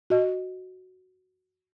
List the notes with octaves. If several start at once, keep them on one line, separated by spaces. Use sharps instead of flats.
F#4 D#5